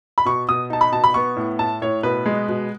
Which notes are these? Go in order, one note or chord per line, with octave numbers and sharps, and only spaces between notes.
B5
B2 C#6
B2 D#6
D#4 A5
B5
B2 A5
B5
B3 C#6
A2
A2 A5
A2 C#5
B2 B4
G#3
B2